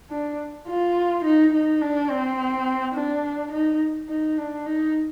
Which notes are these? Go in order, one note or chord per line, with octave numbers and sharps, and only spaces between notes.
D4
F4
D#4
D#4
D4
C4
D4
D#4
D#4
D4
D#4